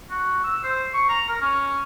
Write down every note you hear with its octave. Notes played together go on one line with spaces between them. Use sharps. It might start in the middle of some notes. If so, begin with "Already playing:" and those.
F#4
E6
C5
C#6
A#5
A#4
C#4